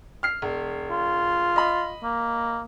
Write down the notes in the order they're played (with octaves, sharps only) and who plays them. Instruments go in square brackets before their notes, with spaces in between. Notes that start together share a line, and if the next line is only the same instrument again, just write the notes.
[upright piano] F6 C7
E1
[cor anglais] F4
[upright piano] D#5 B5
[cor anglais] A#3